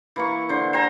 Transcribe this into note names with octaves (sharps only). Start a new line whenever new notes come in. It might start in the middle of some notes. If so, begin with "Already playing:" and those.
E3 A#3 C#6
D3 C5
C5 G5 G#5 A#5